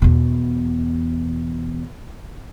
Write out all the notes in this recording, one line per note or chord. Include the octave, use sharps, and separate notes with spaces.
E2 B2